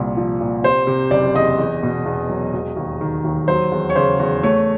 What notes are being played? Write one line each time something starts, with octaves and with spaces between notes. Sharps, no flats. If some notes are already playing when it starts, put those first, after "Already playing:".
Already playing: C2 A#2
F3
A#2
C3 C5
C3
F#1 D5
E2 D#5
E2
B2
E2
F#3
E1
D#2
D#3
D#2
F#3 C5
E2
C#5
C#3 C5
E2
A3 C#5